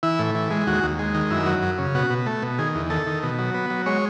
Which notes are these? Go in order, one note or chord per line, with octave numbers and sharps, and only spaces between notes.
E3 E4
A2
E3
G#3
D#2 F#4
D#2
G#3
D#3
F#2 E4
F#3
F#2
C#3
B2 F#4
B2
A3
B2
D#3 G#4
E2
D#3 A4
D#3
B2
F#3
B3
F#3
G#3 C#5